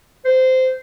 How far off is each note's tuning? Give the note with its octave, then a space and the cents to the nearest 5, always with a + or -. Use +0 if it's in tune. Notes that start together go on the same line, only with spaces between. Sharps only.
C5 -15